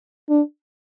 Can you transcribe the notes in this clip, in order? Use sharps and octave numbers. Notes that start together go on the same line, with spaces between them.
D4